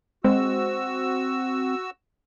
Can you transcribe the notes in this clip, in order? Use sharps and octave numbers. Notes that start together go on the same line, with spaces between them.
G#3 C4 F#4 E6